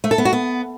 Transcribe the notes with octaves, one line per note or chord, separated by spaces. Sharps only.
A3
A4
B3
F#4
B3